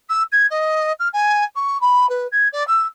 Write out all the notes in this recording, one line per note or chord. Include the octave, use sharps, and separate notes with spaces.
E6
G#6
D#5
F6
G#5
C#6
B5
B4
G#6
D5
E6